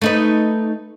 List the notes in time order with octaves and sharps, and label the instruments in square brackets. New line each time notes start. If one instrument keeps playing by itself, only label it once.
[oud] A3 D#4 B4